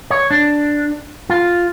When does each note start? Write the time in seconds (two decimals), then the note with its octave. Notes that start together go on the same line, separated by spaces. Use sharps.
0.10 C#5
0.31 D4
1.30 F4